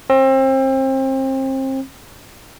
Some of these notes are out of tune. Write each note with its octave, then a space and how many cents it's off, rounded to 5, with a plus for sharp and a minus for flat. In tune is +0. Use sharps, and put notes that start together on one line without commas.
C4 +30